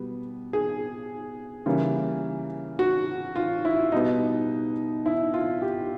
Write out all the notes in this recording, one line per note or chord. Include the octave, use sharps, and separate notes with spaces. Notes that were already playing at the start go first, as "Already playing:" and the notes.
Already playing: B2 G3 B3
G#4
C#3 E3 G3 A#3
F#4
F4
E4
B2 G3 B3 D#4
E4
F4
G4